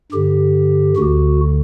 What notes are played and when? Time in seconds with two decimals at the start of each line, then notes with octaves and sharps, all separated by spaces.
0.12 G2 D3 G4
0.96 D2 D3 F#4